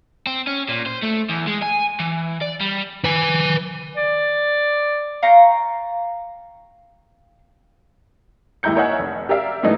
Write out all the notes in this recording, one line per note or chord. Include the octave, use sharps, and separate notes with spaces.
C4
C#4
A#2
C5
A3
E2
G#3
G#5
E3
D5
G3
B4 G#5
D5
F5 G5 A#5 C#6
D#2 G#3 E4 A#5 G6 C#7
A#4 C#5 D#5 E5 F#5 G#5
F1
G4 A#4 D5 E5 F5
G#2 E3 A3 D#4 D#5